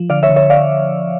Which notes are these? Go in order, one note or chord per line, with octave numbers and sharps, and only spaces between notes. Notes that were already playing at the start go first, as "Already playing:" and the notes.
Already playing: F3
D3 D5 F5
C#5 E5
D3
C#5 E5
D5 F5